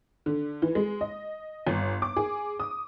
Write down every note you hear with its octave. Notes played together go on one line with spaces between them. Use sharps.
D3
E3
G#3
D#5
G1
D6
G#4
D#6